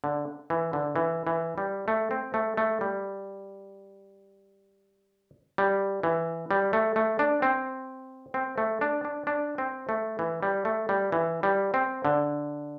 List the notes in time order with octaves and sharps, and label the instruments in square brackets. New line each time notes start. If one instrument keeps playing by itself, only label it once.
[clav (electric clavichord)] D3
E3
D3
E3
E3
G3
A3
C4
A3
A3
G3
G3
E3
G3
A3
A3
D4
C4
C4
A3
D4
D4
D4
C4
A3
E3
G3
A3
G3
E3
G3
C4
D3